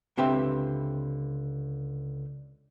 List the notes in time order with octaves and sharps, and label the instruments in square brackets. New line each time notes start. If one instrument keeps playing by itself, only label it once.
[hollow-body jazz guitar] C#2 D3 C4 G4 B4 E5